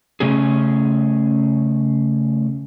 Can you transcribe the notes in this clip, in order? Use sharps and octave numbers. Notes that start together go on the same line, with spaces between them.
C#3 A3 C#4 G#4